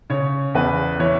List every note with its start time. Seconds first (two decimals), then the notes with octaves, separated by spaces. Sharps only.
0.10 C#3 C#5
0.54 E2 B4
1.00 E3 C#5